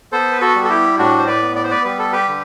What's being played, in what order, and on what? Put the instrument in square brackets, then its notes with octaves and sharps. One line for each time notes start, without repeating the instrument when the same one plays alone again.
[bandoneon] B3 A4 C5
B4
F#4 A4
G3
A4
E4 G4
A2 D4 F#4
C5
B4 D5
B3
D5
C5
B4 D5
G3 B4
A4
G4 B4
D3